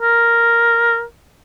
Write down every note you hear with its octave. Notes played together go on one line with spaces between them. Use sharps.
A#4